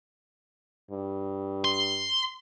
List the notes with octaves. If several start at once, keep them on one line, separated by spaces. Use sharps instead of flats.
G2
C6